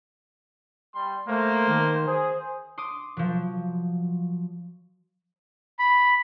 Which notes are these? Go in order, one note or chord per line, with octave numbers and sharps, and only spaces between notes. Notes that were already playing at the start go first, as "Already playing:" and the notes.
G3 C6
A3 A#3 C5
D#3
G#4 C5
C6 D6 D#6
F3 F#3
B5